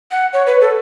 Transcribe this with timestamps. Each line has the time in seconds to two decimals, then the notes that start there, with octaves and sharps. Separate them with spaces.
0.11 F#5
0.33 C#5
0.47 B4
0.61 A4